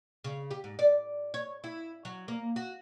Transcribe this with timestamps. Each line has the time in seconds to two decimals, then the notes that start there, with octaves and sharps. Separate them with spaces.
0.24 C#3
0.51 G4
0.64 G#2
0.79 D5
1.34 C#5
1.64 E4
2.05 F#3
2.28 A#3
2.56 F#4